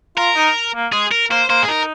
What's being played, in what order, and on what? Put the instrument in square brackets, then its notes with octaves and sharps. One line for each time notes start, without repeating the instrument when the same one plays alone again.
[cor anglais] F4 [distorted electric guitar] A#4
[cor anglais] D#4
A#3
[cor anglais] G#3 [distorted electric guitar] G#4
[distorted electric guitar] A#4
[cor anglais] A#3 [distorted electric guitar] C5
[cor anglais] A#3 [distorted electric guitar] C5
[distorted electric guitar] G#4
[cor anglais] D#4 [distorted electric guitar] A#4